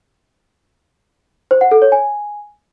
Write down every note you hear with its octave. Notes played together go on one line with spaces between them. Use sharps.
C5
F#5
A4
C#5
G#5